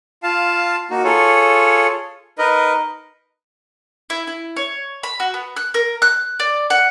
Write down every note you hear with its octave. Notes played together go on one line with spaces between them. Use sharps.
F4 F5 A5
A#3 D#4 F#4
F4 G#4 A4 C#5
D#4 A#4 B4 D#5
E4
E4
C#5
B5
F#4
B3
F#6
A#4
F#6
D5
F#5